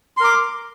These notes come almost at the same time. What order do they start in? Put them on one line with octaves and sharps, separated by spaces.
C6 A#4 D6